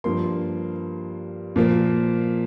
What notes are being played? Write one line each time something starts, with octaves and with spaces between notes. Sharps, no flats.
G2 F3 A#3 C6
A#2 F3 A#3